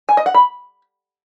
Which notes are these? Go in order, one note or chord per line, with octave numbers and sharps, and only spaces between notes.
G#5
D#5
F#5
B5